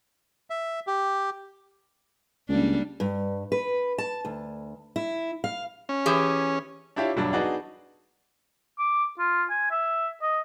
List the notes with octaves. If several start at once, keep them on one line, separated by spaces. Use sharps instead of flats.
E5
G4
C#2 G3 A#3 D4
G2
B4
A5
D2
E4
F5
C#4
E3 G4 G#4
D4 E4 F4 G4 C#5 E5
E1 G2 F#3 D4
B3 D4 D#4 F#4 G#4 D5
D6
F4
G#5
E5
D#5